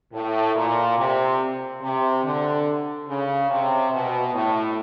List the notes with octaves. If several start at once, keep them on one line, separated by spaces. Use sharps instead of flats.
A2
A#2
C3
C3
D3
C#3
C3
B2
A2